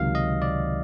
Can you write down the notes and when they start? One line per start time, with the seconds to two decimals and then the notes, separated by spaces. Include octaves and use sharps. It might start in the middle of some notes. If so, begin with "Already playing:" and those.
Already playing: C#2 C3 D#3 F#3 F5
0.15 D#5
0.42 D5